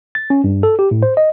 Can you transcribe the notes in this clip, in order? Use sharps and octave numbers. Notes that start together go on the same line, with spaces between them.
A6
C#4
G2
A4
G4
A2
C5
D#5